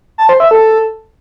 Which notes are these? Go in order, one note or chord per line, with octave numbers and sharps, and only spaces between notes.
A5
C5
E5
A4